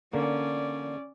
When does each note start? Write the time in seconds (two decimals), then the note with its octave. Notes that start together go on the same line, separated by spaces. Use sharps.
0.13 D3 A#3 C#4 D5